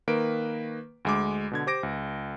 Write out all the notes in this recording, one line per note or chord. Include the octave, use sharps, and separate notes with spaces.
D#3 A#3 B4 D7
D2 G#3 D6
B2 D3 G#6
G4 C5 D6 A#6 D7
C#2